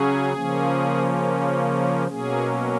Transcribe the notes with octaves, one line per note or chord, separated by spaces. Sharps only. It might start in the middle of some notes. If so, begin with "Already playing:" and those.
Already playing: C#3 F#3 C#4 G#4
C#3 F3 A#3 C#4
B2 F#3 A#3 C#4 G#4